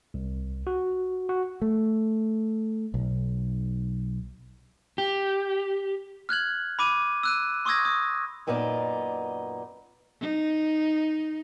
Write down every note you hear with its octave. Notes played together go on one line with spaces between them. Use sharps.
C2
F#4
F#4
A3
B1
G4
F6 F#6 G#6 F#7
B5 D6 D#7
E6 F#6 D#7
C6 C#6 D#6 E6 G#6 A#6
D#6
F#2 A#2 B3 D#4 G#4 D5
D#4